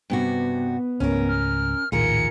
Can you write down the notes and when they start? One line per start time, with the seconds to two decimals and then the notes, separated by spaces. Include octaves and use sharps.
0.10 G2 C3 B3 F#4
1.00 C#2 G#2 A3 C#4 A#4
1.28 F6
1.92 A#1 D#2 A2 D#3 F4 G#4 A#4 C#7